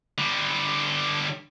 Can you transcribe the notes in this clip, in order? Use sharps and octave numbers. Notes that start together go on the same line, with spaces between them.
D3 G3